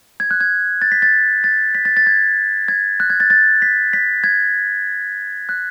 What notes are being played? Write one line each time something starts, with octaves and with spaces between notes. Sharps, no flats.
G#6
F#6
G#6
A6
B6
A6
A6
B6
A6
A6
G#6
G#6
F#6
G#6
A6
A6
B6
B6
G#6
F#6